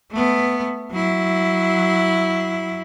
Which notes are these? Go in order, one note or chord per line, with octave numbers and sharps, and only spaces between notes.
A3 B3
F#3 E4